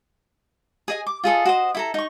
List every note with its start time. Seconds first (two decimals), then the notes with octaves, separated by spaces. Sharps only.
0.88 G#4 D#5 G#5
1.07 D6
1.24 F4 G#4 A4 D#5
1.45 F#4 C5 D#5
1.75 E4 A4 A#5
1.94 D#4 C#6